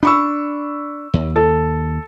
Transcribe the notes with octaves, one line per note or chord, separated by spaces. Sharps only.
D4 B5 C#6 E6
D#2
A4